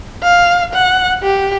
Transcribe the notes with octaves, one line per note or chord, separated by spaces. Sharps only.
F5
F#5
G4